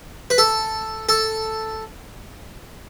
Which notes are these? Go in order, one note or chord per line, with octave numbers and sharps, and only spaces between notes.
B4
A4
A4